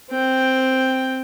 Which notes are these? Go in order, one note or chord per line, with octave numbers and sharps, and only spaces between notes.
C4 G5